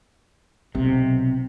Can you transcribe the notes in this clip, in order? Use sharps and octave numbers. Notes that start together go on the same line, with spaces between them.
B1 C3